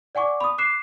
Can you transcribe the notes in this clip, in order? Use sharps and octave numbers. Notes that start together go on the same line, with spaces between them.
D5 F#5 G#5 C#6 D6
B5 D#6
D6 F#6 C7 E7